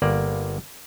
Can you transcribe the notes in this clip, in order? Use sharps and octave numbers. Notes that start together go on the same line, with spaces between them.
G1 A#3 D5